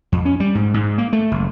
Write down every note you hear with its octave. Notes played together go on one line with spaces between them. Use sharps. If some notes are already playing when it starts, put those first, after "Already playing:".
F2
C#4
G3
G#2
G#2
A#3
A3
F#1